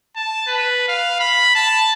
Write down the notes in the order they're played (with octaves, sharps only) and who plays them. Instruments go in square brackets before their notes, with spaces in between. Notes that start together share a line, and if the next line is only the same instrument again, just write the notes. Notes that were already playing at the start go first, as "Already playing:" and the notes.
[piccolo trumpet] A5
B4
F5
B5
A5